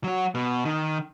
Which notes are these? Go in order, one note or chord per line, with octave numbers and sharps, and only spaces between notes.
F#3 F#4
B2
D#3